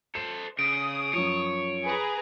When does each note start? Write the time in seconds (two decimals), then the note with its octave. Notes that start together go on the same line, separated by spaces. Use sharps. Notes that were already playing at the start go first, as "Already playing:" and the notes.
0.15 A4 C5 E7
0.59 C#3 D#6 D7
1.13 F#2 F3 C#5
1.84 G#4 B4 A#5